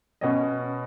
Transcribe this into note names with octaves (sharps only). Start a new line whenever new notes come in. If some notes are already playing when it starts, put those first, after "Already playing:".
B2 C#4 D#5